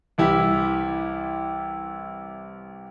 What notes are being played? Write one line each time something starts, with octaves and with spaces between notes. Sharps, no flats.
C2 E3 E4 G4